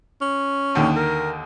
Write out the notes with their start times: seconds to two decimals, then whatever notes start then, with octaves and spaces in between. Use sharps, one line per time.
0.21 C#4
0.75 D#2 D3 D#3
0.96 A#4